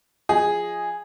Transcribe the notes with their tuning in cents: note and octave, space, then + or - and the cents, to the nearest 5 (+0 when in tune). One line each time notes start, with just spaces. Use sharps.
F3 +0 G#4 -5 D#5 +0